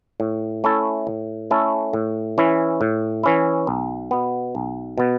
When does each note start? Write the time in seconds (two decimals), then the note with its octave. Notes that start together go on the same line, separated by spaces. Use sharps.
0.20 A2
0.64 A3 C#4 E4 A4
1.07 A2
1.51 A3 C#4 E4 A4
1.93 A2
2.38 E3 C#4 E4
2.81 A2
3.23 E3 C#4 E4
3.67 B1
4.11 B2 B3
4.55 B1
4.98 B2 B3